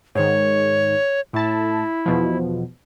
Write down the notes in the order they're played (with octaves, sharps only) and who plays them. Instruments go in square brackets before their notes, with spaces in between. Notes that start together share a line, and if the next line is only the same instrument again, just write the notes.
[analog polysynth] G#2 D#3 [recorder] C#5
[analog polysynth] A2 A5 [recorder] E4
[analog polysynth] E2 B2 F3